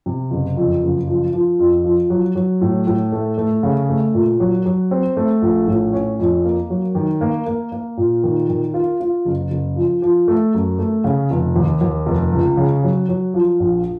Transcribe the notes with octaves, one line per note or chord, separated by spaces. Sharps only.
C3
F#1
F2
F#1
F3
F3
F2
F3
F#3
F#3
A2
A2
A3
A3
C#3
A3
A#2
F#3
F#3
C4
A3
A#1
A2
C#4
F2
A#3
F#3
D#3
A#3
A#3
A#3
A#2
D#3
D#3
F4
F4
F#1
F#1
F3
F3
A3
F#2
A3
C#3
F1
D#2
D#2
F1
C#2
C#3
F#3
F#3
F3
A#1